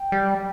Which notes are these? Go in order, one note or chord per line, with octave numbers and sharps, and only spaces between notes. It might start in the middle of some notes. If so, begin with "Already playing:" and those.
Already playing: G5
G3